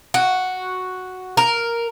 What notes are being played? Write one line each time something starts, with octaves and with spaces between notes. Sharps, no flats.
F#4
A#4